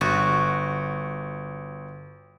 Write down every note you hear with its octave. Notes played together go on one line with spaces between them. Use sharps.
G1 F#4